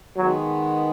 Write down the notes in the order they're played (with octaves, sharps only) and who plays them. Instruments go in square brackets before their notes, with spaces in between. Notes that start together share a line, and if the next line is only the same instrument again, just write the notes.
[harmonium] D#3 G#3 B3 [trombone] F#3